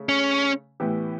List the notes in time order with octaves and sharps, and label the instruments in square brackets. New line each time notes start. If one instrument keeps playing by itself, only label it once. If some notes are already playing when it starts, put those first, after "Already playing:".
Already playing: [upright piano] C#3 A3
[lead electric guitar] C#4
[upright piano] A2 E3 B3 E4 G4